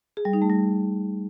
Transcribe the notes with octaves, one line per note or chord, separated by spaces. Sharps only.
G#4
G3
D#4
A3
G3